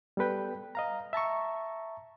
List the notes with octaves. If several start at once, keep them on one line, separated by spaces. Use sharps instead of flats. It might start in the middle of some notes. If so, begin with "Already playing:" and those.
G3 B3 A4 B4 G5
D#5 F5 A#5
E5 A5 A#5 C#6